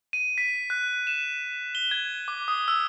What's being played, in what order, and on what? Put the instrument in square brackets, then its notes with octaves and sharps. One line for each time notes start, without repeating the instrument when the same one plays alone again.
[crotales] D#7
B6
F#6
E7
G7
G#6
D6
D#6
E6